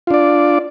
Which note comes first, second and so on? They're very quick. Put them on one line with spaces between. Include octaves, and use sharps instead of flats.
F4 D4 D5